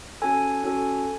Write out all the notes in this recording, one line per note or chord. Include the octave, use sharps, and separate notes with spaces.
C#4 F#4 A4 G#5
C#4 F#4 A4